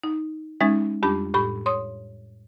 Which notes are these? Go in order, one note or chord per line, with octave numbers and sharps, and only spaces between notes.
D#4
G#3 C#4 D#4 E5 G#6 A6
F2 G3 D4 G4 B5
A2 G4 B5
C#5 C6 D#6